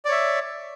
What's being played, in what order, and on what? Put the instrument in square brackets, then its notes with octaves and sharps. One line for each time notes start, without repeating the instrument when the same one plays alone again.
[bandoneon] D5
C#5
E5